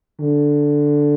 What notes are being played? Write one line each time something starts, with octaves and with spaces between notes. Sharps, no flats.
D3